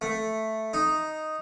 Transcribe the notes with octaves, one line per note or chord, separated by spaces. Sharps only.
A3
D#4